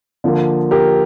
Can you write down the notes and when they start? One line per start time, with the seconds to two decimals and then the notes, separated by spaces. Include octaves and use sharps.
0.24 D3 F3 A#3
0.71 G4 A#4